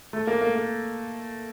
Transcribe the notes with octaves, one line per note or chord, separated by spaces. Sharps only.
A3
A#3
A#3
A#3